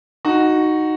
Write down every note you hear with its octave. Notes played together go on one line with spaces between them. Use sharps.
D#4 F#4